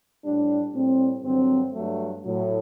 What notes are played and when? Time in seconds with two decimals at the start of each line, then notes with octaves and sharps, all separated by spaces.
0.24 A2 G3 D4
0.74 A2 G3 C4
1.23 G2 D3 F#3 C4
1.73 G2 F#3 A3
2.23 A2 F#3